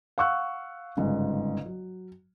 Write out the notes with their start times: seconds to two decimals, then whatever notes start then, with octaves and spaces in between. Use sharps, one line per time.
0.18 F5 F#5 C#6 E6 F#6
0.97 G1 G#2 C#3
1.66 F#3